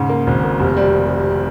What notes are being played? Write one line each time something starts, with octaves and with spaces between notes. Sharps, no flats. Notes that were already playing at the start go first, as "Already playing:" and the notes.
Already playing: G#2 C#3
A#3
G#1
A#3
F1
G3